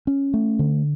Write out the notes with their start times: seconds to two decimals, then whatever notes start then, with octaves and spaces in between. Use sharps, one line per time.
0.07 C#4
0.34 A3
0.59 D3